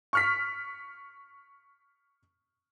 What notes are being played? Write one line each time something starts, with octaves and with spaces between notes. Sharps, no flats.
C#6 F6 B6